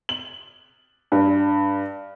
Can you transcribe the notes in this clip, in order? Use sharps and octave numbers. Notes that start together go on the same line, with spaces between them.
F#7
G2